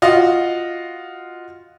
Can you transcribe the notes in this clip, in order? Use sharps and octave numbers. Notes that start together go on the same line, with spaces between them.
F4 F#4 D#5